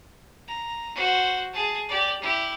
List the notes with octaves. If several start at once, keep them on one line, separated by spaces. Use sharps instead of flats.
A#5
F#4 C5
G#4 A5
G4 D5
E4 G4